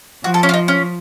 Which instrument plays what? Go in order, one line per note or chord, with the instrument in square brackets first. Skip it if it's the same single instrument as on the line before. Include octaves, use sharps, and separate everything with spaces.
[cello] F3 [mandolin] F#4
[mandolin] A4
C#4
F4
D#4
C#4